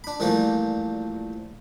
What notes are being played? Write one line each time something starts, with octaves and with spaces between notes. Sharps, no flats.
D4 B5
A#2 E3 F3 G3 A3 A#3